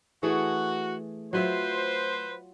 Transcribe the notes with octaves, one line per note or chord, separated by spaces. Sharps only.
E3 A3 F#4 G#4
F#3 F4 B4 C5 E5